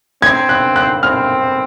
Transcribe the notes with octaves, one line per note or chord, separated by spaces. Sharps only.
C4 G#6
F#6
F#6
C4 F6